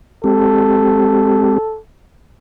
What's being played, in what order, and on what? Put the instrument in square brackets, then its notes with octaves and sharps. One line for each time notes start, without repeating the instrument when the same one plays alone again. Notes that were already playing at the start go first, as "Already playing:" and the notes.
[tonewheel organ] G#3 C4 G4 [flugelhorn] A4